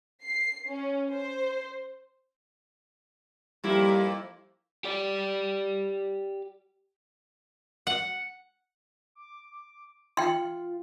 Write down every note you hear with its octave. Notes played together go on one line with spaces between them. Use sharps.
C7
C#4
C5
F2 G3 A#3 E4
G4 D5
F#5
D6
F4 G5 C6